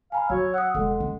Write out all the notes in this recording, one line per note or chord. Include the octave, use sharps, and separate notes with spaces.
F5 G#5 A#5 B5
F#3 F#4 C#5 E6
F#5 D#6 E6
E1 G#3 A4 F#5
C#4